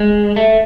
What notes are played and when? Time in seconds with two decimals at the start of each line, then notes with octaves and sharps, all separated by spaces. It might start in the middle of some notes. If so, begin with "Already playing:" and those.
Already playing: G#3
0.36 A3